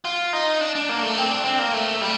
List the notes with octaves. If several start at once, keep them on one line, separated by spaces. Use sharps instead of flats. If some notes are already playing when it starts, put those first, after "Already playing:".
F4
D#4
D4
D4
A#3
A3
C4
D4
C4
A#3
A3
G3